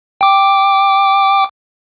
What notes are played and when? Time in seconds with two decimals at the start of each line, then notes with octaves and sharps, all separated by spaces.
0.21 G5 D6